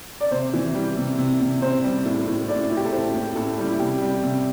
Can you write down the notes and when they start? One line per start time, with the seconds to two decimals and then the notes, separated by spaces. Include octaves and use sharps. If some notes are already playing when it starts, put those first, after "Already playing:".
0.21 D5
0.31 C3 C5
0.54 E3
0.75 G3
0.97 C3
1.18 C3
1.40 C3
1.62 C3 C5
1.84 G3
2.06 A2
2.27 A2
2.49 A2 D5
2.70 A2 E4
2.77 G4
2.86 A4
2.92 A2 C5
3.14 A2
3.36 A2 A4
3.58 G3
3.69 E4
3.79 C3 G4
4.01 G3
4.23 C3